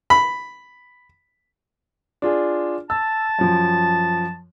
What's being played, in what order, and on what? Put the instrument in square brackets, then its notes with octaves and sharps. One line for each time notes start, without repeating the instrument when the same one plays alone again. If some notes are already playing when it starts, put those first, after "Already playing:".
[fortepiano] B5
[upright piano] D4 F4 G#4
[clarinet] A5 [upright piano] E6
[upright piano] F#2 F3